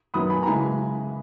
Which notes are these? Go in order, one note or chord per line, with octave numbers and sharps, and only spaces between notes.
F#2 D#3 F#3 B3 B5 D#6
G#5 B5
A#5
C#3 E3 G#3 G#5 B5